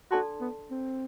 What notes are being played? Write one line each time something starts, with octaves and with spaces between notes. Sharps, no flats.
D4 F#4 A4 D5 A5 C6
B3
C4